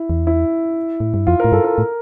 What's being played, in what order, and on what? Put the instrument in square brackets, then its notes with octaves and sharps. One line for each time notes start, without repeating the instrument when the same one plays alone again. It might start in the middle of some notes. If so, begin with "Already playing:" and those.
Already playing: [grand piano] E4
[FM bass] E2
[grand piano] E4
[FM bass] A2
G2
[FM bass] F2 [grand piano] F4
[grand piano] A#4
[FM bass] A2
[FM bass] G2 [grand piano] A4
[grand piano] A#4
[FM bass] A2